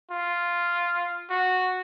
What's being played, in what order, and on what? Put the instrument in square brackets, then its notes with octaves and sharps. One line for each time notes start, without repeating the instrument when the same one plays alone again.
[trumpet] F4
F#4